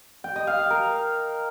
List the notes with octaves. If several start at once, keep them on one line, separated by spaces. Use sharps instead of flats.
G5
D#5
F5
F5
A#4